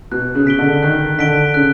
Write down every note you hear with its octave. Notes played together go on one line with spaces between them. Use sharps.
B2 F#6
C#3
B6 D7 G7
D3
D#3 F#6
D3 B6 D7 G7
C#3 F#6